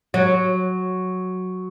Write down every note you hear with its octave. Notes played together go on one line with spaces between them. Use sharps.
F#3